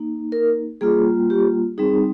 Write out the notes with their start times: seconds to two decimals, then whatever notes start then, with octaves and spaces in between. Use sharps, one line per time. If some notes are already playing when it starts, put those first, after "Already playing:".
Already playing: A#3 D#4
0.32 A#4
0.81 G3 A#3 F4 G#4
1.30 G4
1.78 G3 C4 D#4 G#4